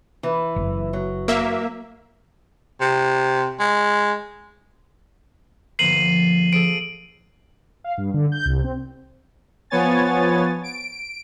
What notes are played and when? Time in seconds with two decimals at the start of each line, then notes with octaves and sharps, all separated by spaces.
0.23 E3
0.56 F#1
0.93 F#3
1.28 A#3 E5
2.81 C3
3.60 G#3
5.79 G1 F3 A#3 C7 D#7 F#7
6.53 F3 G#4 A4 D7
7.84 F5
7.98 G2
8.14 D3
8.32 G6
8.45 C2
8.64 C4
9.70 F3 B3 C#5 G#5 A6
10.64 D7